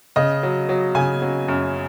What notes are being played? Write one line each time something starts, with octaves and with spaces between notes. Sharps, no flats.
C#3 D#5
F#3
F#3
C#3 G#5
F#3
F#2